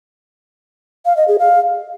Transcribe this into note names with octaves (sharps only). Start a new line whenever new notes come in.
F5
D#5
G#4
F5